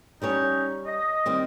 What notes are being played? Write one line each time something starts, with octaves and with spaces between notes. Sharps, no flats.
G3 C#4 D#4 G4 C#5
D#5
D#3 G3 C4